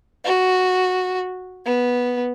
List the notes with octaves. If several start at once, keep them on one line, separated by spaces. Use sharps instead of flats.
F#4
B3